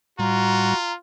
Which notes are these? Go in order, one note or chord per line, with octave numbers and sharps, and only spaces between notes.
A2 G3 F4 F#4 A#5